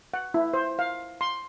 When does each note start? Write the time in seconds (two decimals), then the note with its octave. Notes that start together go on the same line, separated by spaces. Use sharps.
0.14 F#5
0.34 E4
0.54 C5
0.79 F5
1.21 C6